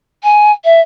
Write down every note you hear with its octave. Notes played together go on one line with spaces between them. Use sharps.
G#5
E5